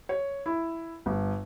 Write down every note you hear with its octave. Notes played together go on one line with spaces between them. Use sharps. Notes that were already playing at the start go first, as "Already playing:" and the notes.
C#5
E4
G1